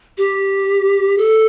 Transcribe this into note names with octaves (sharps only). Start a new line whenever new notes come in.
G4
A4